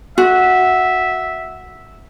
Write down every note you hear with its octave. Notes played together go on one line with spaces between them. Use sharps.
F#4 E5